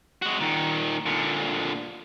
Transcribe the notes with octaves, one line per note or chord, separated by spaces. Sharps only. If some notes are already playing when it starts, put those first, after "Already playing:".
G#3 F#4
A#2 D#3
A#2 D3